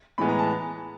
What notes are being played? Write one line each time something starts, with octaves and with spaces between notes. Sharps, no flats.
A2 E3 G#3 B3 B5
A#5
A5